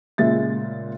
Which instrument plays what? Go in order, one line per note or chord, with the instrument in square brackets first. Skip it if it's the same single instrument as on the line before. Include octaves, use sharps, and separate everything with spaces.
[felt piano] A#2 C#3 G#3 E5 A6